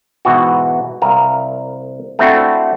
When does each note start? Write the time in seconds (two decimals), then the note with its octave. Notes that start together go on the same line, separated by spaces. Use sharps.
0.25 G#2 B2 E3 F#4
1.02 C2 A#4 F5
2.19 A3 C4 D4 E4 F#4